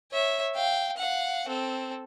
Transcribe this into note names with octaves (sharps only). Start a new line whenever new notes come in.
C#5 E5
F5 G5
F5 F#5
C4 A4